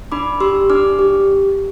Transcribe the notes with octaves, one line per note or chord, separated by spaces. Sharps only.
D4 B5 D6
G4 C6 E6
D4 D6 F6
G4